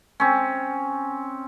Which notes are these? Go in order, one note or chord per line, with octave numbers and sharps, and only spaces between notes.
C4 C#4